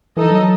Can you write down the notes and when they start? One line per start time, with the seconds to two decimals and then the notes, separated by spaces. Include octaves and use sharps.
0.17 E3 D#4 A4 D#5
0.31 F#3